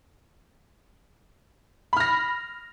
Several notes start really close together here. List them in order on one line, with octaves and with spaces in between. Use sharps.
B5 F6 A#6